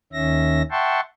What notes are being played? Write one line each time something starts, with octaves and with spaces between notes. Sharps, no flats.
D#2 D#3 C#4 E5 A#6
E5 F#5 G5 A5 C6 C#6